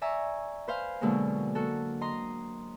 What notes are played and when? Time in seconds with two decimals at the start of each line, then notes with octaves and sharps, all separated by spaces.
0.01 D5 E5 G#5 A#5 C#6
0.67 B4 C5 F5 G#5
1.01 B2 D3 F#3 G#3 A#3
1.55 A#3 F#4 A4
2.01 D#5 A#5 C6